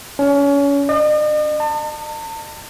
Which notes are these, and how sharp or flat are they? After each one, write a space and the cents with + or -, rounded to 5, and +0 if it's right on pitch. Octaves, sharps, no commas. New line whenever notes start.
C#4 +30
D#5 -45
A5 +40